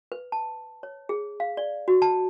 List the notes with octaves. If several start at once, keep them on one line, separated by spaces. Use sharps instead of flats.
B4
A5
C#5
G#4
F5
D5
F#4
A5